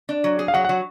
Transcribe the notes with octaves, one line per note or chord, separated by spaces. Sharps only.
D4
F#3
G#4
F5
F#3 F#5
F#3 F#5